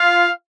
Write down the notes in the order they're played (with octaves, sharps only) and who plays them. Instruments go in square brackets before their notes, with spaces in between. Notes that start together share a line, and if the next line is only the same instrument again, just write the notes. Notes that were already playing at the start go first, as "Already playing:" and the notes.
Already playing: [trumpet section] F4 F5